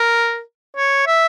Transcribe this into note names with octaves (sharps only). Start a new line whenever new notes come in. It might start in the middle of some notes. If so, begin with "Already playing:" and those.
Already playing: A#4
C#5
E5